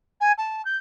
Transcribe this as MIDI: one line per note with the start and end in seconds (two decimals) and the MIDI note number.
0.21 0.32 80
0.38 0.62 81
0.65 0.77 91